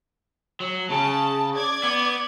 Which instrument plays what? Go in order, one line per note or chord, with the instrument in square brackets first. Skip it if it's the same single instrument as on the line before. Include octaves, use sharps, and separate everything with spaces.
[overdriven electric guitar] F#3
[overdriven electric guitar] C#3 [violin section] A5
[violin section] D5 G#6
[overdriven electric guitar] B3